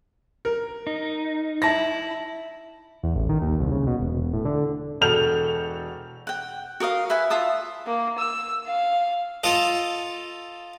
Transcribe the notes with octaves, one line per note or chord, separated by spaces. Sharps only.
A#4
D#4
E4 A5 A#6
E2
A1
D#3
D#2
C2
C#3
B2
E1
E1
A2
D3
E1 F#4 A4 F6 G6 F7
F#5 G5
F#4 A#4 D#5 F5
B4 E5 F#5 G#5
F4 E5 A5 D#6
A#3
E6
F5
F4 A4 D#5